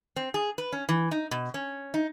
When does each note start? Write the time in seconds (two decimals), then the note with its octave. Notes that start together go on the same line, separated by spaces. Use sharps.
0.16 C4
0.34 G#4
0.58 B4
0.72 C#4
0.89 E3
1.11 D#4
1.31 B2
1.54 C#4
1.94 D#4